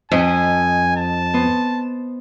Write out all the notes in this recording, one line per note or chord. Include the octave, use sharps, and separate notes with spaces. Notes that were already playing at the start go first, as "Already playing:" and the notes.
F2 D#5 G#5
A5
B3 C5